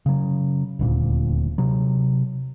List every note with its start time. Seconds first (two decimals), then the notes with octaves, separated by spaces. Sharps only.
0.06 C#3 F#3
0.79 D#1 D2 A#2
1.58 C3 F#3